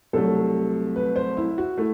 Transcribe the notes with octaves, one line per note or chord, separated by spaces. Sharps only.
C2 C3 F#3 A3 A4
B4
C5
E4
F#4
A3 E4